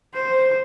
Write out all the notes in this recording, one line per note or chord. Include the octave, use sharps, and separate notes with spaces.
C5